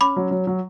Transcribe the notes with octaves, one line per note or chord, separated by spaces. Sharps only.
C#4 B5 D6
F#3
F#3
F#3